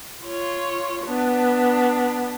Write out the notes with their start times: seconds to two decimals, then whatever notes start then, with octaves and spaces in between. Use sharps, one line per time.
0.23 F4 C#5
1.05 B3 D4